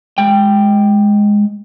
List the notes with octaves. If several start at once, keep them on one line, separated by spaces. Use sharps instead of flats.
G#3 G5